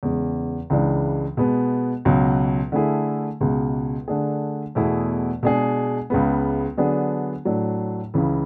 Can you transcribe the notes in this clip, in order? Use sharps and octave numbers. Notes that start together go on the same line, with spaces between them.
E2 C#3 G#3
C#2 C#3 E3 G#3 D4
B2 G#3 B3
C#2 B2 F#3
D3 A3 E4 G#4
C#2 B2 G#3
D3 A3 D4 G#4
E2 B2 A3 E4 G#4
B2 G#3 D4 G#4
C#2 C#3 G#3 B3
D3 F#3 B3 D4 G#4
A2 F#3 A3 D4
C#2 C#3 E3